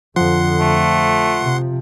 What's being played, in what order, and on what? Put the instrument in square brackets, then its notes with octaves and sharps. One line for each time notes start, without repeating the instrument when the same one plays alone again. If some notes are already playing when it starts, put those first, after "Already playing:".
[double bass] F2 D3 [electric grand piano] F3 [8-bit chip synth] F#5 C6
[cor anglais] A3
[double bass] C3